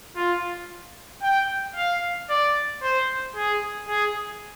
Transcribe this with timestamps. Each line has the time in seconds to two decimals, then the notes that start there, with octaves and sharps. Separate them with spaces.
0.16 F4
1.22 G5
1.76 F5
2.29 D5
2.83 C5
3.36 G#4
3.88 G#4